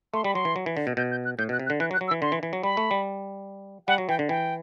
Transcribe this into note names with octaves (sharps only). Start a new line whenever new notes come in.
A3 C6
G3 B5
F#3 C6
E3
F#3
E3
D3
B2
B2 G6
G6
F#6
A2 G6
B2 F#6
C3
F#6
D3
E3 F#6
F#3
F#6
F#3
E6
E3
D3 C6
E3
E3
F#3
G3 B5
A3
G3
G3 F#5
F#3
E3 G5
D3
E3 G5